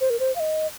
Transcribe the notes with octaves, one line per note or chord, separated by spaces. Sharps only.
C5
A#4
C5
F5
D#5